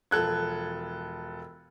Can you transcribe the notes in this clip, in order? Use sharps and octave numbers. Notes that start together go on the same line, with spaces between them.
E1 F3 A4 F#6 G#6